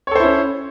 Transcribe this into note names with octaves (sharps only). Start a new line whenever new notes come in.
C#4 E4 A4 C5 C#5